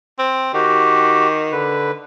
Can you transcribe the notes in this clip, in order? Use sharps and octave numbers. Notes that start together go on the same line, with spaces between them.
C4
D#3 F#4 G4
D3 B4